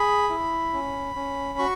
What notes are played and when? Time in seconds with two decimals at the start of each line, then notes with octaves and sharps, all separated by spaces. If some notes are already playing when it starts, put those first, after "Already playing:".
Already playing: G#4 B5
0.30 E4
0.73 C#4
1.16 C#4
1.59 F#4 C#6